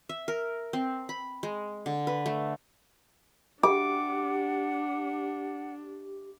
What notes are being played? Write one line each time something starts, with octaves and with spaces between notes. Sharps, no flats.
E5
A#4
C4
B5
G#3
D3
B4
A3
D4 G4 F#5 D6